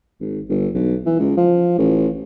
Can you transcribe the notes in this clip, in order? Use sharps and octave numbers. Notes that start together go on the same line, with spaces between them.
G#1
G1
B1
E3
C#2
F3
A1